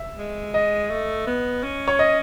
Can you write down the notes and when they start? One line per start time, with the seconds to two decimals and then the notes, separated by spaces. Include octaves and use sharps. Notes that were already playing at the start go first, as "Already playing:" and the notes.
Already playing: E5
0.19 G#3
0.54 D#5
0.90 A3
1.27 B3
1.63 C#4
1.88 C#5
1.99 D#5